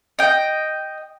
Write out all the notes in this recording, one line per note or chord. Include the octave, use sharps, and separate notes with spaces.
D#5 G5